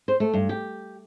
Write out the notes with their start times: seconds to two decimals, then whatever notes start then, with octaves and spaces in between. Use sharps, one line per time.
0.08 C5
0.20 A3
0.34 G2
0.49 G4